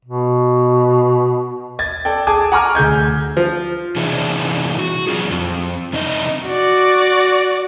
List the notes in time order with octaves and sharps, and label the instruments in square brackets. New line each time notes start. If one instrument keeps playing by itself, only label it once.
[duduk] B2
[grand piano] G#6 A6
A4 D5 G5
G#4 G#5 A5 D6 D#6 G#6
F#5 G#5 A#5 C#6 D6 F6
D2 G#4 G6 G#6
[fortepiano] F3
[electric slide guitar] C3 E3 D4 D#4 G#4
F#4
E3 F#3 F4 G#4
F2
F2 C3 D4 D#4 F4 D#5
[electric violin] F#4 D5